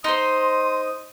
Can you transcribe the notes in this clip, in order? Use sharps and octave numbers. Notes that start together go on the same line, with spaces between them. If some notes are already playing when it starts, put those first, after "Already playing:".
D#4 C5 C6 D#6